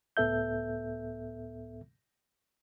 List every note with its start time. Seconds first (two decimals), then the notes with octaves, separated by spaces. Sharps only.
0.17 C#2 A2 B3 A4 E5 G6